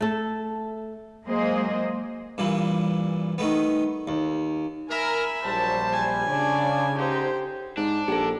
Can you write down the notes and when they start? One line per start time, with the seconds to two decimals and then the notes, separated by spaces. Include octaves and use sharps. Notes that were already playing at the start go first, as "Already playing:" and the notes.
0.01 A3 A4
1.26 F#3 G#3 A#3 G#4 C5 D#5
2.38 G2 A#2 E3
3.38 D#3 A3 B3
4.08 D#2
4.91 A#4 E5 G#5 B5
5.45 A#1 F#3 G3 C5 A5
5.93 G#5
6.27 C#3 D4 C#5 D5
6.98 D3 D#4 G4 C5
7.77 G#2 D4
8.08 A#1 G4 A4